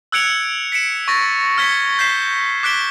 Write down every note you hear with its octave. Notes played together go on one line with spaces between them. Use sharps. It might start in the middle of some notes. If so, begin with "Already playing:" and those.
E6 F#6 G#6 C#7 D7 F7
B6 C#7 D7 E7
C#6 A6 A#6
F6 G#6 B6 C#7 G7
G6 B6 C7 E7
D6 F#6 B6 D7 G7